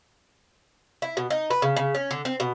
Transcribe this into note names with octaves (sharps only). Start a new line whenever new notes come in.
E4
B2
D#4
B4
C#3
C#3
C#4
D3
C4
B2